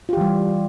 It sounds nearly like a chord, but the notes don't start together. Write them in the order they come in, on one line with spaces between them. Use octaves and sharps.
F4 G4 E3 G3